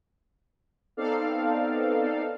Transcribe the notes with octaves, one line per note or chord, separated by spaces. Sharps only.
B3 C4 D#4 A4 D5 F5